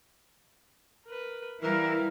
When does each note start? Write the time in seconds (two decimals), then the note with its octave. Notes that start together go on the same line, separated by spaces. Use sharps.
1.06 A#4 B4
1.63 E3 G3 E4 A#4 F5